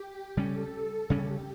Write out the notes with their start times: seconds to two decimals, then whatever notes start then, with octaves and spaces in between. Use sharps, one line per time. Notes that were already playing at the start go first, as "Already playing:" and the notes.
Already playing: G4
0.36 C#3 G3 C#4 A4
1.10 C#3 G3 C#4 G4